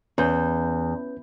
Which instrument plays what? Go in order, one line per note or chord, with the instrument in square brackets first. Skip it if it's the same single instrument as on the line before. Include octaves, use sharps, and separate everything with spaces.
[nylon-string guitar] E2 [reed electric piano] C#4 B4 G6